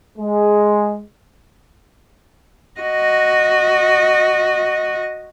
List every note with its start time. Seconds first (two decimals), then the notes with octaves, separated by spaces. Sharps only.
0.18 G#3
2.80 F#4 D#5